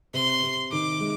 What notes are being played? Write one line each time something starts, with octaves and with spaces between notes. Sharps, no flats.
C3 C6
C3
D#3 D6
G#3